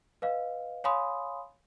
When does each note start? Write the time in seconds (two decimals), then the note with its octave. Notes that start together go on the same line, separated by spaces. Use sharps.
0.22 B4 D#5 F5
0.84 C#5 F5 G#5 B5 C6 D#6